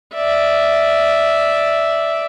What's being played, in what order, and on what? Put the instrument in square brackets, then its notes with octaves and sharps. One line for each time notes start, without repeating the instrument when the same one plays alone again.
[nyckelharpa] D5 E5